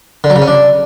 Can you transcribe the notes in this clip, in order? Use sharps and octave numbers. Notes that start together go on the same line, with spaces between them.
D3
F#3
C#3
C#4
D4